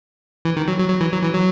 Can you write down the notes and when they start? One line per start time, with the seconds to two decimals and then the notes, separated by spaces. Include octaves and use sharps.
0.45 E3
0.56 D#3
0.68 F#3
0.79 F#3
0.90 F#3
1.01 E3
1.12 F#3
1.23 E3
1.34 F#3